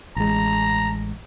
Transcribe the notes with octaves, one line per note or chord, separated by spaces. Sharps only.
A1 G#3 A#5